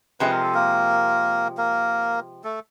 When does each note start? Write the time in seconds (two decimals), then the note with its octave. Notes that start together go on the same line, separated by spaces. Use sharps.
0.20 C3 F3 G#3 B4
0.31 A#4
0.43 A4
0.54 A#3 A#4
1.57 A#3 A#4
2.44 A3 A4